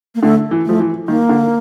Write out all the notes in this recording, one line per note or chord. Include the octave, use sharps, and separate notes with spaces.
A#3
D3 A3
E3
F3 A3
E3
D#3 A#3
D3